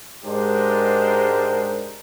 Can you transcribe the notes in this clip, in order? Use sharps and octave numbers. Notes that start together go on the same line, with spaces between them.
G#2 G#3 D4 G4 A#4 C5